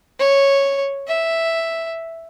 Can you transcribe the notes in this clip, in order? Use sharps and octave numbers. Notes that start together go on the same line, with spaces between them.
C#5
E5